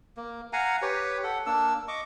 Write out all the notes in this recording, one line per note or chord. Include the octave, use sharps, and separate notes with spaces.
A#3
F5 F#5 G#5 A#5
G4 B4 C#5
A4 F#5
A#3 D4 E6
D#5 C#6 D6